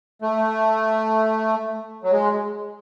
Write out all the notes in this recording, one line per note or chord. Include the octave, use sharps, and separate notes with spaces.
A3
F#3
G#3